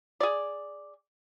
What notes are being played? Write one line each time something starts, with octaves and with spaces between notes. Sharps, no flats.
G#4 D5